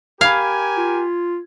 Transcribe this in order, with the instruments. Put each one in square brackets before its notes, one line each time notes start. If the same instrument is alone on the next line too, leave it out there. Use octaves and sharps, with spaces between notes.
[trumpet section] G4 A#4 G#5 [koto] F5 [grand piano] B5 G#6
[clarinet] F4